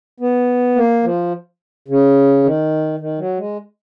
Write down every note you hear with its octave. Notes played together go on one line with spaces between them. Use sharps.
B3
A#3
F3
C#3
D#3
D#3
F#3
G#3